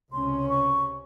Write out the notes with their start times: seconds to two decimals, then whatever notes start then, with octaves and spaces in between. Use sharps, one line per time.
0.12 C#2 C3 C#4 C6
0.49 C#6